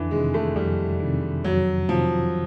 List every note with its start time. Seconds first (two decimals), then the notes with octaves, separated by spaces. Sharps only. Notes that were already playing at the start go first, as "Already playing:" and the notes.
Already playing: F2 D3 E3
0.11 C3 D#3 G#3
0.34 A3
0.55 F2 G3
1.00 C3 D#3
1.44 F2 F#3
1.88 C3 D#3 F3